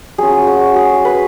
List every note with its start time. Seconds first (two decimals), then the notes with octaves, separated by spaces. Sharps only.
0.18 F#3 C#4 F4 G#4
0.47 F#4
0.76 G#4
1.05 B4